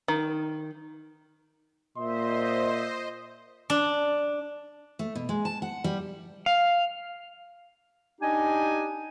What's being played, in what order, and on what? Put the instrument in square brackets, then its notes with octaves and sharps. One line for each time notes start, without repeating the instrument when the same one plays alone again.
[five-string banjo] D#3
[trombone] A#2 [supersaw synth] C5 D#5 [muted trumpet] E5 [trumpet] C6
[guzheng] D4
[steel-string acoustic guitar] A3
B2
G#3
A5
F#5
G3
[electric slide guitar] F5
[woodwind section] D4 D#4 G4 D#5 G#5